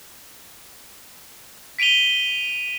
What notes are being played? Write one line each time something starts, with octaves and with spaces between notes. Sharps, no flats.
B6 D7 D#7 F7 G7